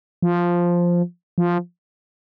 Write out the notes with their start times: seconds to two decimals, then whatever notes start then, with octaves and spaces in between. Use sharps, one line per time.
0.22 F3
1.38 F3